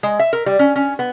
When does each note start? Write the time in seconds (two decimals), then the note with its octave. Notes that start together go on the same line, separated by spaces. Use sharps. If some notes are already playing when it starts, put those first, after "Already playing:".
0.03 G#3
0.20 E5
0.33 A#4
0.46 G3
0.59 C#4
0.76 C#4
0.99 B3